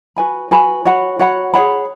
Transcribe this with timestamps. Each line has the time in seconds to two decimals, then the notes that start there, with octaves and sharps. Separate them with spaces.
0.16 F#4 B4 G#5 B5
0.51 F#4 B4 G#5 B5
0.85 F#4 C#5 F#5 B5
1.19 F#4 C#5 F#5 B5
1.54 G#4 C#5 F#5 B5